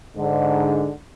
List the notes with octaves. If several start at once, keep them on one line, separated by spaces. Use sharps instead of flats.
G#2 D3